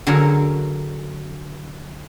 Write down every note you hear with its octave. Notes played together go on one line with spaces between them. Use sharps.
D3 F#3 F#4 G#4 A#4